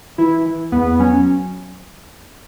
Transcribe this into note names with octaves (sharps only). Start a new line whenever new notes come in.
E3 E4
E3
E2 B3
B3
F#3 C#4